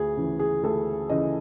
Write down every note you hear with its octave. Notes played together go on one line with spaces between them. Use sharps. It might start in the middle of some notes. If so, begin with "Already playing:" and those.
Already playing: D2 G#4
C#3 E3
G#4
D2 A4
C#3 E3 D#5